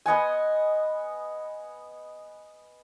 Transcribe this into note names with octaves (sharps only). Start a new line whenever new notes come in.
B3 D#5 F#5 G#5